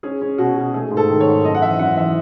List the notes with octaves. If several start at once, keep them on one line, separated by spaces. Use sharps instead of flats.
C#4 G#4
C#4
B2 F#4
B2
A3 G#4
G#2
A4
D#3
C#5
G#2
F#2 D#5
F#5
E3 E5
F#2 F#5
E3 E5